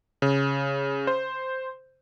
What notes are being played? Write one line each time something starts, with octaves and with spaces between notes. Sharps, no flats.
C#3
C5